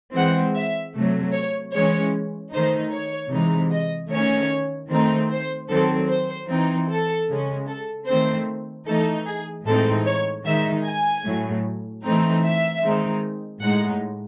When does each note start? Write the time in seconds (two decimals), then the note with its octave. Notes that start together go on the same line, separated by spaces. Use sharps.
0.15 E3 G#3 C4 F#5
0.55 E5
0.95 C3 F#3 A3
1.34 C#5
1.74 E3 G#3 C#4 C#5
2.53 D#3 A3 D#4 C5
2.93 C#5
3.32 C3 E3 G#3 D#4
3.72 D#5
4.11 D#3 A3 C#4 C#5
4.91 D#3 A3 C4 D#4
5.31 C5
5.70 D#3 F#3 C4 A4
6.10 C5
6.49 E3 C4 D#4
6.89 A4
7.28 C#3 G#3 C#4
7.68 A4
8.08 D#3 A3 C4 C5
8.87 E3 A3 D#4 A4
9.26 G#4
9.66 A2 E3 G#3 C4 D#4 A4
10.06 C#5
10.45 D#3 G#3 D#4 E5
10.85 G#5
11.25 A2 F#3 A3
12.04 E3 A3 C4 D#4
12.44 E5
12.83 D#3 G#3 C4 D#4
13.62 A2 G#3 D#4 F#5